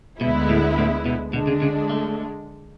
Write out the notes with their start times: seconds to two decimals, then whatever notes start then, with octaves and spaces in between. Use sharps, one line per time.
0.21 D2 B2 D3 G#3 B3 E4
0.49 A2
0.78 A2
1.06 B2
1.33 B2 D3 G#3 D4
1.47 C#3
1.62 C#3
1.90 A3